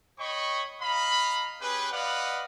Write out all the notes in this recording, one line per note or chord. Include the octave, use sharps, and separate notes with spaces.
C#5 D#5 G5 B5 C#6
D#5 F5 A#5 B5
C#4 G4 G#4 B4
B4 D5 D#5 F5 F#5 B5